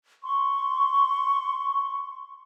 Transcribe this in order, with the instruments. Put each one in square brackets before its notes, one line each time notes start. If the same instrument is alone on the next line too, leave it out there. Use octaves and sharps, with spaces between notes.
[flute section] C6 C#6